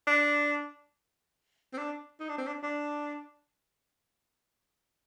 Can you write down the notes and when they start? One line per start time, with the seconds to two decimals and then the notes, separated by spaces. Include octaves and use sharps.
0.07 D4
1.73 C4
1.78 D4
2.20 D#4
2.29 D4
2.38 C4
2.47 D4
2.63 D4